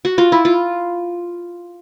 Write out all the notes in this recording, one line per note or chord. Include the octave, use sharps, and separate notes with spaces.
F#4
F4
E4
F4